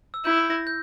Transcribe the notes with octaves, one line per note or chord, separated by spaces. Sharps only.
E6
E4 G6
A#6
G6